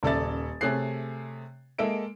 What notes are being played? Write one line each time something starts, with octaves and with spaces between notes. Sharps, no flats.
D#1 C#3 A4 D5 E5 A6
C3 A3 G#4 C#5 F#6 C7
G#3 A#3 A4 E5 D7